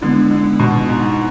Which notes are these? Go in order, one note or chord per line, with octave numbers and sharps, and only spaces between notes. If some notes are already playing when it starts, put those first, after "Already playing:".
D3 G#3 B3 E4
D3
B2
G#2